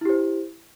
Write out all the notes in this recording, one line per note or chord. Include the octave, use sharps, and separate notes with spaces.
E4 G4 C5